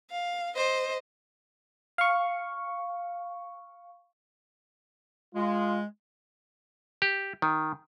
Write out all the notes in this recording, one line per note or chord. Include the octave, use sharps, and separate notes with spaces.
F5
C5 D#5
F5 C#6
G#3 F4
G4
D#3